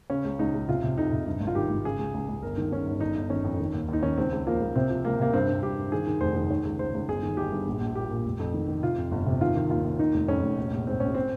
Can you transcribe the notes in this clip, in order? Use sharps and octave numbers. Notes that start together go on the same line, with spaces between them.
C#3 C#4
C#2
C#2 D#4
C#2
C3 F4
C3
F2 D#4
C3
G2
G#1
F4
D#3 G4
G#1
C#3 G#4
C#2
C#2
C#2
G1 A#4
D#3
D#3 C#4
G1
G1 D#4
G1
D#3 C#4
F2
D#3
D#2
D#2 D#4
D#3 C#4
C#2 C4
C#2
F3 A#3
C#2
C3 C4
F3
C#2 A#3
C3 A#3
G2 C4
G2
G2 G4
G2
D#3 G#4
D#3
F1 C5
D#3
D#3 C#5
C#2
C#2 C5
C#2
G1 G#4
D#3
G1 G4
G2
A#1
A#1
A#2 G4
A#2
F1
F2
D#3
D#3
C3 F4
F2
G1
C3
D#3 F4
D#3
D#2 F4
D#2
D#3 D#4
F1
F2 C#4
F1
A#1
A#1
G#2 C4
A#1 C#4
C4